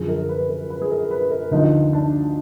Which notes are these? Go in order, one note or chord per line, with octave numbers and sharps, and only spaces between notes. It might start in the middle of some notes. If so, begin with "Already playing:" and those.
Already playing: F#2 D3 F3 G#4
A#4
B4
A#4
B4
G#4
A#4
B4
A#4
D2 D3 F3 D#4
D4